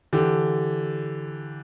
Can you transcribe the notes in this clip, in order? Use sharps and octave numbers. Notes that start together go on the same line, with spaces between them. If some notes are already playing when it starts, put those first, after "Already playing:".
D3 E3 G4